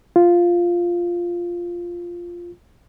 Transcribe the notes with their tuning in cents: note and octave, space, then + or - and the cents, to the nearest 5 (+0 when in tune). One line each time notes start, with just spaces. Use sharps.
F4 -5